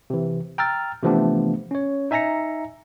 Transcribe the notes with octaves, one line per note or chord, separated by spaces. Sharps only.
C3 E3
G5 A#5 E6 F6 A6
C3 E3 F3 A3 B3 D4
C#4 C#5
D#4 E5 G#5 A#5 A#6 C#7